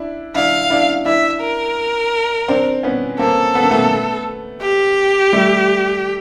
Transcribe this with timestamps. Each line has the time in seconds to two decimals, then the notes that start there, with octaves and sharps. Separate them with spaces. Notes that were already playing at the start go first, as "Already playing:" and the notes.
Already playing: D4 E4
0.35 D4 E4 F5
0.70 D4 E4
1.05 D4 E4 E5
1.41 A#4
2.48 C4 D4
2.83 B3 C#4
3.19 A#3 C4 A4
3.55 B3
3.63 A#3
3.71 A3 B3
4.62 G4
5.32 G3 A3